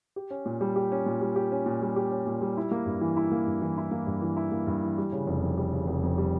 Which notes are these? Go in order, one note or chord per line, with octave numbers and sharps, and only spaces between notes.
G4
C#4
A#2
G3
G4
C#4
A#2
G3
G4
C#4
A#2
G3
G4
C#4
A#2
G3
E4
A#3
G2
E3
E4
A#3
G2
E3
E4
A#3
G2
E3
E4
A#3
G2
E3
G3
C#3
F1
F2
G3
C#3
F1
F2
G3